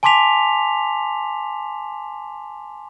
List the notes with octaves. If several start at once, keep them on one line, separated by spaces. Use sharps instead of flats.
G#5 A5 C6 D6 B6 F7